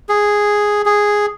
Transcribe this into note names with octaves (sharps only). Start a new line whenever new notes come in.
G#4
G#4